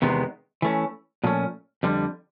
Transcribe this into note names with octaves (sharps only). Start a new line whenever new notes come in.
E2 C3 D#3 G#3 B3
E3 A3 C#4
A#2 F3 A3 C#4
F2 D3 G3